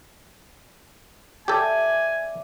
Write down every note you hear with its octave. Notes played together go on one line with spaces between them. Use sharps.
G4 A4 D5 E5 G#5